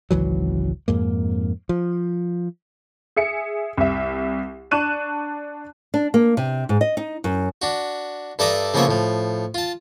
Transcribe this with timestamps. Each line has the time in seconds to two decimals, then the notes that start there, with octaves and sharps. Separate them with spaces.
0.11 G#1 C#2 E3 F#3
0.88 F2 G#2 A#3
1.69 F3
3.16 G#4 E5 C#7
3.77 C2 E5
4.71 D4 A5 C#6 F#6 D#7 E7
5.94 D4
6.14 A#3
6.37 C3
6.69 G#2
6.81 D#5
6.97 D#4
7.24 F#2
7.62 D4 F#4
8.39 G2 A4 D5 E5 A#5 D#6
8.74 C#3 F3 A#3 B3 C#5 E5
8.87 A2 F3
9.54 F4 A5